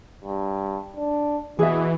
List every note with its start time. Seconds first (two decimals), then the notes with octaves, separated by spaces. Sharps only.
0.24 G2
0.96 D4
1.59 B2 E3 G#4 E5